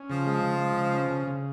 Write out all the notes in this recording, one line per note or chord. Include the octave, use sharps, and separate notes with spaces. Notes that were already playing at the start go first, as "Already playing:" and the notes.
Already playing: C#4
C#3 F3
G#3
C#3
G#3
C#3
C#4
C#3
C#3